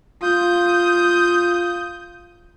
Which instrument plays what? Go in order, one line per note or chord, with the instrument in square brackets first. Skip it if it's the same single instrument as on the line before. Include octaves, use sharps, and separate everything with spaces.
[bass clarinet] F4 [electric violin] D#6 G6